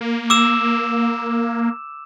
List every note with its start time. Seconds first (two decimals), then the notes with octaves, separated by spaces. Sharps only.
0.01 A#3
0.30 D6 E6 E7